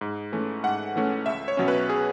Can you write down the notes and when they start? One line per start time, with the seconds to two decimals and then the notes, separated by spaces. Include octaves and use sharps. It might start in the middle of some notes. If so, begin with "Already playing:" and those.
0.01 G#2
0.32 E3 A3 C#4
0.63 G#2 F#5
0.96 E3 A3 C#4
1.26 C#2 E5
1.48 C#5
1.57 B2 F#3 C#4
1.68 B4
1.89 G#4